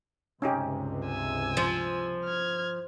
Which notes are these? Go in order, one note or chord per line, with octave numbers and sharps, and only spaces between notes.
C#2 G2 C3 C#4 D#4 G4
G#5 E6
F3
F6 G#6